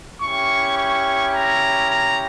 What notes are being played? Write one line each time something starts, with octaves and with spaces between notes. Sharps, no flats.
C#4 E4 G4 C#6
C#6
A#5
A#5